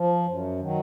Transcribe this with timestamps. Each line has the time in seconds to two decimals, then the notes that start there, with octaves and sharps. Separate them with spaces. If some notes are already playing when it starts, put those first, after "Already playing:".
Already playing: F3
0.27 F#2
0.60 D#3 F#3